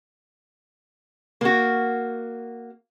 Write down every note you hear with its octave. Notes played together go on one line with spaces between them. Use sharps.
A#3 F#4